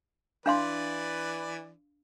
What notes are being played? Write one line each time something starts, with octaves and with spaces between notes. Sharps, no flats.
E3 D4 B4 D5 F5 C6